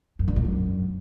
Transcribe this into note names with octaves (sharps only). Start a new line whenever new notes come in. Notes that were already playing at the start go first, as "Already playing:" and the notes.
F#2
D3
G#2
F#2